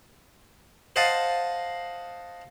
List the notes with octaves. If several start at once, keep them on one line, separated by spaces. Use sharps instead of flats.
C5 D#5 F5 F#5 A5